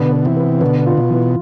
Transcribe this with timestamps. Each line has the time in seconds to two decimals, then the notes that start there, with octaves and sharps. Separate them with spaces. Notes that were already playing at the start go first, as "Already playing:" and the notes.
Already playing: B2 D3 B3
0.13 B3
0.25 C3 E3
0.37 B3
0.61 B2 D3 B3
0.86 F4
0.98 B2
1.10 E3